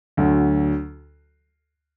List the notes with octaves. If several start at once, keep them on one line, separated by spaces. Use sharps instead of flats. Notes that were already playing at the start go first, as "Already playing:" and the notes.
D2 D3 F#3